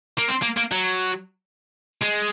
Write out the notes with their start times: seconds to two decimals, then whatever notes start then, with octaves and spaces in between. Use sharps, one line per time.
0.18 A#3
0.28 C4
0.42 A#3
0.57 A#3
0.72 F#3
2.02 G#3